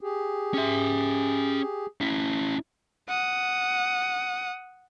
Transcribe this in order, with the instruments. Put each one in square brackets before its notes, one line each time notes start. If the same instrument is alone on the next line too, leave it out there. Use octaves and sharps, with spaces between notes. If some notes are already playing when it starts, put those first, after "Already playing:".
[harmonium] G4 G#4
[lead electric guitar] C#4 E5
C#4 E4
[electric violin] F#5 D#6